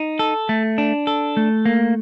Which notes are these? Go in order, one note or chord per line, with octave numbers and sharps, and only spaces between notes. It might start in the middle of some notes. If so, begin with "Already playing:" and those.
Already playing: D#4
A4
A3
D4
A4
A3
A#3